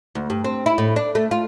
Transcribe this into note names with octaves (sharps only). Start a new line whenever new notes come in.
D2
G2
C4
E4
A2
D4
A3
F4